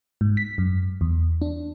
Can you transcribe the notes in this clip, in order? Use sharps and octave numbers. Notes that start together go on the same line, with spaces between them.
G#2
B6
F#2
E2
D4